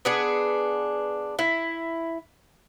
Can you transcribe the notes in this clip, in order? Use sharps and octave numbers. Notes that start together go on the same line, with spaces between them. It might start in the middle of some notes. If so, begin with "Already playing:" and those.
B3 D4 G#4
E4